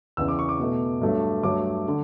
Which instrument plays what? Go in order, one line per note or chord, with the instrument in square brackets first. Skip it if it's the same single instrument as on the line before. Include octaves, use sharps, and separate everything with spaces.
[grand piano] E2 C#3 E3 E6
D6
C#6
D6
B2 A3
G2 F#3 A3
G2 F#3 A3 D6
D3